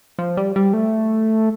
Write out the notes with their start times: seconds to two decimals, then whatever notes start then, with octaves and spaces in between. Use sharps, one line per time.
0.19 F3
0.37 G3
0.56 G3
0.73 A3